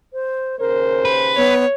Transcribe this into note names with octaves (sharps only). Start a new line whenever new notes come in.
C5
D#2 C#3 A#4 C5
B4
B3 C#5